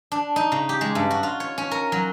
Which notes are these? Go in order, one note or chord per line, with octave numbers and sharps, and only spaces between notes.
D4
D#4
C#3
G4
G#3
G2
F#4
F4
C#5
C#4
A#4
F#3